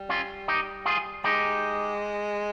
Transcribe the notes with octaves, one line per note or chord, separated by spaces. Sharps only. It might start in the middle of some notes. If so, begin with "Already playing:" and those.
Already playing: G3
C#4 F4
D#4 G4
F4 G#4
G#3 D#4 G4